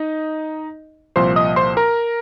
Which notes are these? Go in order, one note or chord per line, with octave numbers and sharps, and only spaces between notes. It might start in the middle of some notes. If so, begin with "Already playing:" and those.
Already playing: D#4 D#5
C2 A#2 F3 C5 C6
D#5 D#6
C5 C6
A#4 A#5